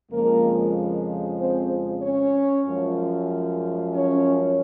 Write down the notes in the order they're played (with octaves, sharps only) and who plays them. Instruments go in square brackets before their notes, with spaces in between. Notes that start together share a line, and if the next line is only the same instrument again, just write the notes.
[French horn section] F2 C#3 F3 G#3 A#3 A#4
C4 C5
C#4 C#5
F#2 F3 G#3
C#4 C#5